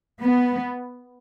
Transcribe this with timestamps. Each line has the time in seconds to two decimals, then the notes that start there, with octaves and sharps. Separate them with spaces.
0.21 B3